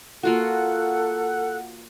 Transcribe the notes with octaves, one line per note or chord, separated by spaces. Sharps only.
A#3 F4 F#4 A4 F#5